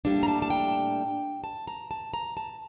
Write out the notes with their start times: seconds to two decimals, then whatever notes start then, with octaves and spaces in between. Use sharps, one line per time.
0.05 A2 G3 A#3 D4 A5
0.23 A#5
0.28 A5
0.42 A5
0.50 G5
1.44 A5
1.67 A#5
1.91 A5
2.14 A#5
2.37 A5